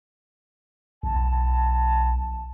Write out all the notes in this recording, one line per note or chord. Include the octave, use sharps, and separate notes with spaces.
B1 A5